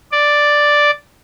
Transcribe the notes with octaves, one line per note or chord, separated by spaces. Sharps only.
D5